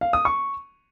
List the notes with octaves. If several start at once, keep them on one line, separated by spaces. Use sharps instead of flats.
F5
D#6
C#6